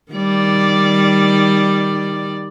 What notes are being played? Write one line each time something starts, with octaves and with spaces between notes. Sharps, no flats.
D#3 G3 D5